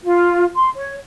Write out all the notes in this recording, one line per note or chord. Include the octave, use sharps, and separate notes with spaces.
F4
C6
C#5